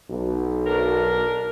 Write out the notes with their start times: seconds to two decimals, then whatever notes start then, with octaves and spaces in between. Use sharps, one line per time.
0.10 B1
0.66 D4 A#4